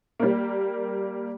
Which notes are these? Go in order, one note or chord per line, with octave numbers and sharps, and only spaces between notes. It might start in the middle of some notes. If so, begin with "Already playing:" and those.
G3 A#3